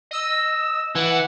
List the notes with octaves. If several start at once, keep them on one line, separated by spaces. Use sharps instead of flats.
D#5 E6
E3 F#5